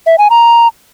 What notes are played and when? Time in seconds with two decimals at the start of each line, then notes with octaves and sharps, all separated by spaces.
0.06 E5
0.18 G#5
0.30 A#5